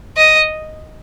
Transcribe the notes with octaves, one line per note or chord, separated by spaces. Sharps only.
D#5